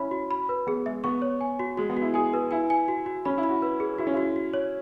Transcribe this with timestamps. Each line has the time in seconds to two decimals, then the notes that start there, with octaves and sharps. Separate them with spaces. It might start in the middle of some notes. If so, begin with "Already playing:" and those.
Already playing: C#4 E4 C#5 B5
0.11 F#4
0.31 B5
0.49 B4
0.67 B3 G#4
0.86 G#3 E5
1.04 B3 C#6
1.22 C#5
1.41 G#5
1.59 F#4
1.77 G#3 F#4
1.90 B3
1.97 F#4
2.02 E4
2.14 G#4 G#5
2.34 G#4 B4
2.51 E4 G#5
2.70 G#5
2.88 F#4
3.06 F#4
3.25 C#4 B5
3.38 E4
3.43 B5
3.49 F#4
3.62 B4
3.80 G#4
3.98 E4 F#4
4.07 C#4
4.14 E4 F#4
4.36 F#4
4.54 C#5